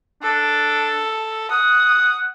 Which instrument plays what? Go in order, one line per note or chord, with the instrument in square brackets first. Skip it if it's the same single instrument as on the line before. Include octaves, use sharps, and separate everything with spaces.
[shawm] D4 [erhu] A4
[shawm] F#5 [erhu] D#6